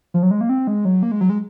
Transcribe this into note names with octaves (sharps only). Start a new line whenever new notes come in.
F3
F#3
G#3
A#3
C4
G#3
F#3
A#3
G#3
F#3
G#3